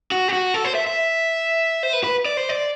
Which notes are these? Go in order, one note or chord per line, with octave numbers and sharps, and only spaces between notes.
F#4
G4
F#4
A4
C5
E5
E5
C5
B4
B4
D5
C5
D5